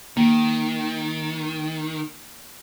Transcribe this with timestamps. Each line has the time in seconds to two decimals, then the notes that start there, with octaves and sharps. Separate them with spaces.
0.17 D#3 A#3